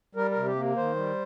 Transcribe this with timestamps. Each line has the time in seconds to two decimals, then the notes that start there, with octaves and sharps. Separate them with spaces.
0.15 G3 A#4
0.31 A#4
0.37 C3
0.46 G4
0.55 A#3
0.76 D#3 C5
0.96 G3